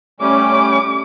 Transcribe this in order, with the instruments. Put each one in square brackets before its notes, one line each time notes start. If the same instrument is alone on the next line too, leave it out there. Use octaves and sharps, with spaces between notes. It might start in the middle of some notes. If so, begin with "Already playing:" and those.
[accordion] G3 A3 C#4 [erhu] D6